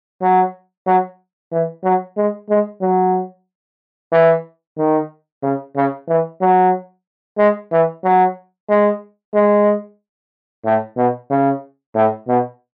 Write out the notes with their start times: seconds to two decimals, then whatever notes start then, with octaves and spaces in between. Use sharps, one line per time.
0.22 F#3
0.87 F#3
1.52 E3
1.84 F#3
2.17 G#3
2.50 G#3
2.82 F#3
4.12 E3
4.77 D#3
5.43 C#3
5.76 C#3
6.08 E3
6.41 F#3
7.38 G#3
7.72 E3
8.04 F#3
8.69 G#3
9.34 G#3
10.65 A2
10.97 B2
11.31 C#3
11.95 A2
12.28 B2